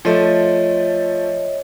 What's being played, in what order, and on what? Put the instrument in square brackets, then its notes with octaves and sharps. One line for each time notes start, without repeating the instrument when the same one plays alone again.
[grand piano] F3 A3 [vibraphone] C#5 D#5 E5